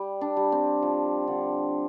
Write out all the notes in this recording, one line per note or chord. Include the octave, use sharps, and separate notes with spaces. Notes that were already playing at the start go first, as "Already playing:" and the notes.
Already playing: G3
D4
G3
C4
F3
D3